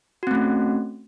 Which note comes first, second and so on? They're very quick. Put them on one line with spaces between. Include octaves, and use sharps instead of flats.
F#4 C4 A3 C#4